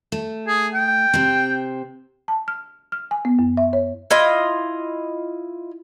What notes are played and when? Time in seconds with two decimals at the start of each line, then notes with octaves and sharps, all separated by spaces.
0.12 A3
0.47 G#4
0.74 G5
1.14 C3 C4
2.28 A5
2.48 F6
2.92 F6
3.11 G#5
3.25 B3
3.39 F#2
3.57 E5
3.73 C#5
4.11 E4 F4 D#5